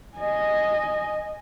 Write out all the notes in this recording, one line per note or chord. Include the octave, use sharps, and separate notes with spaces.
D#5 G#5